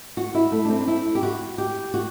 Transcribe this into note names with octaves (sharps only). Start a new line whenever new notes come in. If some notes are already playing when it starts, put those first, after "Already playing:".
F#4
E4
A3
D4
C4
D4
E4
G4
F#4
G4
F#4